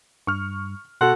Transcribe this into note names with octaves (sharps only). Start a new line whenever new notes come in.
G2 C#6 F6
B2 F#4 A4 F#5 C6